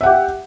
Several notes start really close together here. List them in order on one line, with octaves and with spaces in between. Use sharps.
E5 F#5 G4